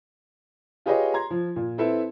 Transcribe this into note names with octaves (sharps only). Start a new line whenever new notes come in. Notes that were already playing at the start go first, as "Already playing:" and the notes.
F4 G4 G#4 B4 C#5 D#5
A#5 C6 G#6
F3
A#2
C4 E4 A4 B4 E5